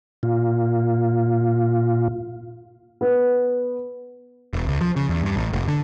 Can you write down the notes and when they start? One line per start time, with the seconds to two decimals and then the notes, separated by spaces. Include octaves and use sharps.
0.23 A#2 F4
3.01 B3
4.53 E1
4.67 C#2
4.81 F3
4.96 C#3
5.09 E2
5.21 G2
5.36 A1
5.53 F1
5.68 D3